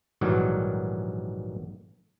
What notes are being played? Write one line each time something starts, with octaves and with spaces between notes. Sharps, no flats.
A#1 G#2 D#3 E3 F#3 G3